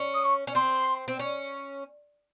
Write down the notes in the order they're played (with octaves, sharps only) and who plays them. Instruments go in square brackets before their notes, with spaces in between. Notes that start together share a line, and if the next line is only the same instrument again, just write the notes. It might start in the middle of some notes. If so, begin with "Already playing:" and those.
Already playing: [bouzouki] C#4
[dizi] D#6
C#6
[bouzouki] C#4
[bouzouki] C4 [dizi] C6
[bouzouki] C4
C#4